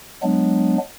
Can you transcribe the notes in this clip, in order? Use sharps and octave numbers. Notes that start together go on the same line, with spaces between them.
F#3 G#3 B3 D4